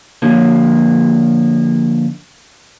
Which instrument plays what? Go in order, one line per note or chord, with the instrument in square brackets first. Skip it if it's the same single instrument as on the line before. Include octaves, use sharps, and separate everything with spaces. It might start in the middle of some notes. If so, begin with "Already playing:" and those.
[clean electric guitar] D3 F3 A#3